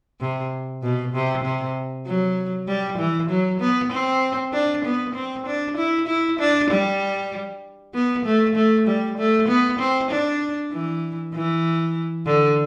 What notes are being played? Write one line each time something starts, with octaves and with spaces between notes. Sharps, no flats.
C3
B2
C3
C3
F#3
G3
E3
F#3
B3
C4
D4
B3
C4
D4
E4
E4
D4
G3
B3
A3
A3
G3
A3
B3
C4
D4
E3
E3
D3